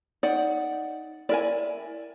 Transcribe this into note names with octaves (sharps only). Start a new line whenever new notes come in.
D#4 D5 F#5
E4 A#4 D5 G#5